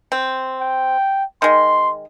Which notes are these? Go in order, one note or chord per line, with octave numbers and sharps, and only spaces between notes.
C4
G5
D#3 G#3 C6